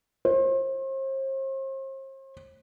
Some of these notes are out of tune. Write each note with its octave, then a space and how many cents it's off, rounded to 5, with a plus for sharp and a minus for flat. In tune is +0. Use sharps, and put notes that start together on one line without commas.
C5 +40